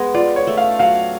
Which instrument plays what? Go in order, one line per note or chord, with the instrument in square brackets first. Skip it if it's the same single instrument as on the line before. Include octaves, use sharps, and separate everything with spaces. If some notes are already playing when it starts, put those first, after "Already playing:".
Already playing: [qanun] G#3 B3
[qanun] F4 [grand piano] D5
[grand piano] C#5
[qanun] A3
[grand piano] F5
[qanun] F#3 [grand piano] F5